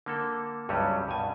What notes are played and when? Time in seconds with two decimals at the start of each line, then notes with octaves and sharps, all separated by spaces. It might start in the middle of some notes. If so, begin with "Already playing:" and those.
0.06 D3 A#3 A4
0.69 C#2 G2 F#3 G3 C#4
1.08 G2 B2 G#5